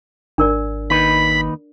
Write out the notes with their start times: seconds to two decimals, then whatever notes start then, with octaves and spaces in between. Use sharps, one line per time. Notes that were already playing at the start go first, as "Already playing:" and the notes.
0.38 G#1 D4 A#4 D5
0.90 D#2 D#4 B4 B5